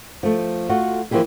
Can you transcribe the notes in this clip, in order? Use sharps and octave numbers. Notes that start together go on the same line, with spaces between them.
F3 A3
A3 F4 F#4
E3 F3 A#3 E4 G4 G#4